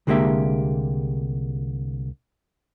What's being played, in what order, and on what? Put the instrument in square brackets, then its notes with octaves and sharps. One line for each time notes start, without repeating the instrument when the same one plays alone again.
[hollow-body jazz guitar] C2 D3 G#3 A#3 G4 E5